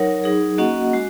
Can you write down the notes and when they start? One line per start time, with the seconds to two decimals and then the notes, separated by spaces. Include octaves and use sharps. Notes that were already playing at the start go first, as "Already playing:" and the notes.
Already playing: F#3 D#4 A#4 C#5 F#5
0.24 F#3 D#4 G#4
0.58 A#3 C#4 F#4 D#5 F#5
0.93 G#3 F#4